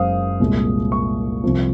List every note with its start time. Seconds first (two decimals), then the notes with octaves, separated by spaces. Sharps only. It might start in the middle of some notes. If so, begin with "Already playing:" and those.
Already playing: F#1 F#2 C#3 G#3 C5 F5 D#6
0.40 C2 A#2 G#3
0.92 C#6
1.44 C2 C3 F3